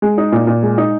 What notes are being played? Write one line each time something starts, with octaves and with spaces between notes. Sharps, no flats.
G#3
D#4
A#2
A#2
G#3
D#4